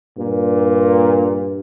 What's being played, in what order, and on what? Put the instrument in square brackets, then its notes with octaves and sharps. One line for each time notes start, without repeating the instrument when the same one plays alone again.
[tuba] G2 [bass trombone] A#2